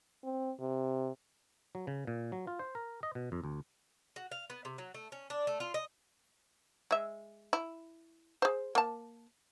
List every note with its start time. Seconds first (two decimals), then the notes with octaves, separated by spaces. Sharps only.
0.24 C4
0.60 C3
1.75 F#3
1.87 C#3
2.07 A#2
2.32 F#3
2.47 F4
2.59 C5
2.75 A#4
3.03 D#5
3.15 B2
3.32 F2
3.44 D2
4.16 F#4
4.32 F5
4.50 B3
4.65 C3
4.78 F#3
4.94 A3
5.12 C#4
5.30 D4
5.47 A3
5.60 F4
5.74 D#5
6.91 G#3 E5
7.53 E4
8.42 G#4 C5
8.75 A#3 A5